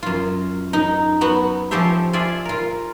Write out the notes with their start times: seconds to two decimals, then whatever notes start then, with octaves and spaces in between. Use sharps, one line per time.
0.03 F#2 F4
0.73 D#4
1.21 F#3 B3 F#4
1.71 F3 C#4 G4 A4 C5 E5
2.13 F4 G#4 D5 E5
2.45 F4 A#4